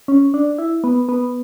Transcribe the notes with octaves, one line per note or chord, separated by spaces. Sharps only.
C#4
D4
E4
B3
B3